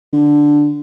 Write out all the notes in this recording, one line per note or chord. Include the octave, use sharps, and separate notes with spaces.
D3